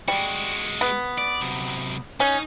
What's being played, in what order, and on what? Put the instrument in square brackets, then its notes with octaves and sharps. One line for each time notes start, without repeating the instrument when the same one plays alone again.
[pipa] G3 [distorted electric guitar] G#3 F#4
[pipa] B3
[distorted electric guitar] D5
C3 F#3
[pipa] C#4 [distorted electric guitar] D#4